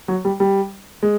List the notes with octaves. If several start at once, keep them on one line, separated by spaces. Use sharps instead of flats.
F#3
G3
G3
G#3